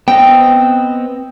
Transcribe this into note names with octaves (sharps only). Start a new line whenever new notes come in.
B3 C4 D#5 G5